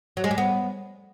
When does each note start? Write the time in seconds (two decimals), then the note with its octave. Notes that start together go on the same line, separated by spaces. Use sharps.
0.17 F#3
0.24 G#3
0.31 G3
0.38 B3